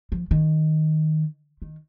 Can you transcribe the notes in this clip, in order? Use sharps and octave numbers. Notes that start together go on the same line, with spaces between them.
F3
D#3
D#3